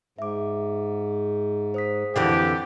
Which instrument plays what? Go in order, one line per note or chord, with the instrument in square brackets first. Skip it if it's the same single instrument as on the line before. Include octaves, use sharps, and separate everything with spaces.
[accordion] G#2 [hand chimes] E5 D6
[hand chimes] C5 D#6 B6
[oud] F2 D3 E3 [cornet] G4